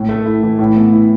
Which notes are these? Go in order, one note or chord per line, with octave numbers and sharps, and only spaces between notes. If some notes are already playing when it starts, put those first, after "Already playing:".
Already playing: A2
A3
E4
E3
A2
B3
E4